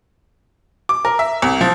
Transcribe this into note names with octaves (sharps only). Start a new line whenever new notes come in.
D6
A#4
E5
C2
F3